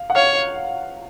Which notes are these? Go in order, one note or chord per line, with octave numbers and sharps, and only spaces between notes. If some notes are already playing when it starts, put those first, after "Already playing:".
Already playing: F5
F#5
C#5 F5